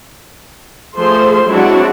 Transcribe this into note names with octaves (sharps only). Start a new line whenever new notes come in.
F3 A3 G#4 A4 C5 C6
F#3 G#3 C4 D4 E4 F#4